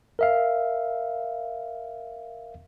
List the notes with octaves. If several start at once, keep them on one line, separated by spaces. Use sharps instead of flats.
A#4 E5 F5